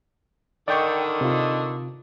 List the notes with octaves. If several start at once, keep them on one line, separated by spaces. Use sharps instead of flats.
D3 D#3 D5 G5 C#6
C3 F4